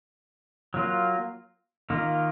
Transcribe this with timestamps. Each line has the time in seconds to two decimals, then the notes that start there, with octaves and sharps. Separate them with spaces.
0.74 F#3 A#3 F4
1.90 D#3 A#3 F4